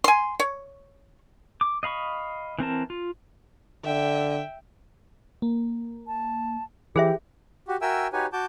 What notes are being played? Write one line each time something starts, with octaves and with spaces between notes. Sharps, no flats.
G#5 C6
C#5
D6
D#5 F5 B5 C#6
E3 C4 A#4 A5
F4
D3 E5 G5
A#3
A5
E3 G4 G#4 C5 E5
F#4 G4
F#4 A#4 E5 G5 G#5 E6
D#4 F#4 G4 B4 C#5 G#5
F#4 A5 D6 G6